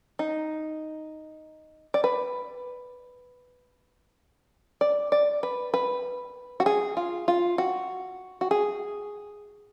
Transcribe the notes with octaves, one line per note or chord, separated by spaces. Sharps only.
D#4
D5
B4
D5
D5
B4
B4
F#4
G#4
F4
F4
F#4
F#4
G#4